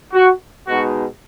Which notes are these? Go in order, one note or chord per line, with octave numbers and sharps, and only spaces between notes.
F#4
B2 G#3 D#4 F#4